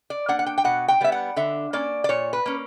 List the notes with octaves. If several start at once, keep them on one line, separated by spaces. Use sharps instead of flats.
D5
A#3 D4 F#5
F#5
G5
G5
B2 F#5
G5
G3 B3 E5
F#5
D3 E5
A#3 C#4 D5
D5
A#2 C#5
B4
A#3 C#4